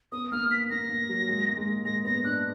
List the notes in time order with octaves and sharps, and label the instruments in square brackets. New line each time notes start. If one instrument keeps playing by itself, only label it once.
[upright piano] B3 [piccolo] D#6
[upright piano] A#3 [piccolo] F6
[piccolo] B6
[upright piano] A#3 [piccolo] A#6
[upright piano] A#3
F#3
G#3
A#3
G#3
[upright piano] G#3 [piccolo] A#6
[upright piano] B3 [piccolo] A#6
[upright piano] D4 [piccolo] F#6